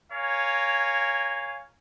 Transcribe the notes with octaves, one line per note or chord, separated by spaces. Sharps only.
A#4 C#5 F5 G#5